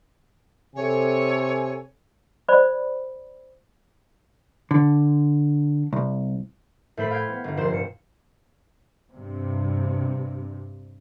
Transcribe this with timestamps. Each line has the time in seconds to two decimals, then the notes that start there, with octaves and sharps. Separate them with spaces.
0.75 C3 A4 C#5 G#5
2.48 C5 D5 B5
4.71 D3
5.93 C2
6.97 A2 A3 C5 B5
7.11 F5 G5 G#6
7.29 B3
7.44 G1
7.57 F1 A#2 C5 C7 E7
7.71 G2 C#7
9.12 G2 C3